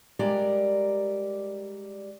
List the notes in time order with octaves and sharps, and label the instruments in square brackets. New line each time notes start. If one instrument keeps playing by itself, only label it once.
[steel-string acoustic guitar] G3 G#3 G4 A#4 D5 A#5